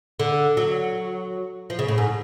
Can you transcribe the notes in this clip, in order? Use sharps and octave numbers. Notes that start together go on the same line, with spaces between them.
D3
F#3
F3
C#3
A2
G#2